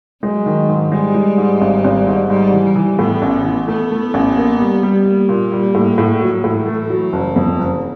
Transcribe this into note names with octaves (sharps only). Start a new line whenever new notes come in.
F#3 G#3
D#3
G#2
G3 G#3
G#3
G#2
G#1
G#1
G#2
G#2 G3
E3
G3
E3
A2 B3
A1
E3
A3 B3
A3
A1
A#3
G3
G3
G3 A#3
A#2
G3
A2
A2
F#3
A2 E3
A3
F#3
F#1
F2
F#1